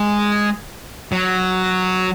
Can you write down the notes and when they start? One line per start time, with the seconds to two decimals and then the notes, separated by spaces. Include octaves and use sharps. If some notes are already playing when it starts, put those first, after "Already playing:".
Already playing: G#3
1.12 F#3